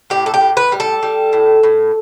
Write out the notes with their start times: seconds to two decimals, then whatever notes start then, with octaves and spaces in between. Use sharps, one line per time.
0.10 A2 G4
0.26 A4
0.34 G4
0.41 A2
0.57 B4
0.72 G3
0.80 A4
1.03 G3
1.33 A2
1.63 A2